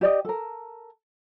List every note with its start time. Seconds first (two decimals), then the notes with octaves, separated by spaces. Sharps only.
0.01 G4 D5 D#5
0.25 A4 A#4